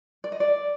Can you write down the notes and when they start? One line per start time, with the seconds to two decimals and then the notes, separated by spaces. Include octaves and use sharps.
0.24 D5
0.32 D#5
0.40 D5